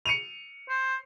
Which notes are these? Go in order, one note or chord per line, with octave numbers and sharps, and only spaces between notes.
C#7 D#7 F7
C5